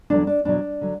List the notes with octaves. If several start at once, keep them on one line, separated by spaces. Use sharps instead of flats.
E2 D3 F#3 D4
D4
E2 B2 F#3 D4
D3 F#3